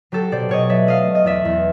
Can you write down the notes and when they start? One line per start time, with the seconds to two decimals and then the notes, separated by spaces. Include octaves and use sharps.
0.12 F#3 G4 A4
0.32 B2 C5 D5
0.49 B2 C#5 D#5
0.69 F#3 D5 E5
0.87 A3 D#5 F5
1.07 A3
1.15 D#5
1.25 E2 D5 E5
1.45 E2